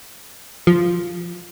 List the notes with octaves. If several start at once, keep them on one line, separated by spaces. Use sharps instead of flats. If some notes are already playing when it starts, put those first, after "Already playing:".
F3